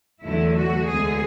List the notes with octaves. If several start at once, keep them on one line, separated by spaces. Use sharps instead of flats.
E2 D3 F#3 A3 E4
F#4
D2 D3 G#3 B3 G#4